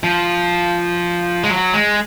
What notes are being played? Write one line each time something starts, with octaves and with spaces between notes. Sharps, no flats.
F3
G#3
F#3
G#3